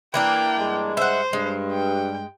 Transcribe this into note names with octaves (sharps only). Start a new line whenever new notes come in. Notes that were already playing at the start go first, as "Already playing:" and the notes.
E3 A#3 D4 G5
G2 G#3
C5 E5 F#5
G2 G#3
G5